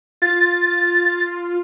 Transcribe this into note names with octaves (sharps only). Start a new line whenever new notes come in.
F4 A6